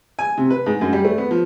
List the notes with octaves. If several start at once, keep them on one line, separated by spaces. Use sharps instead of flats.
G#5
C3
B4
G#2
F#2
G3
A3
B3
F3